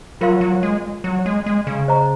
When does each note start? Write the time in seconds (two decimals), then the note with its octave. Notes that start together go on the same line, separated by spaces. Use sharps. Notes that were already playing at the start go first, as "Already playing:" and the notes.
0.21 F#3 F4 A#4 F5 C6
0.41 F#3
0.63 G#3
1.04 F#3
1.26 G#3
1.46 G#3
1.67 C#3
1.88 C5 D#5 A#5 C#6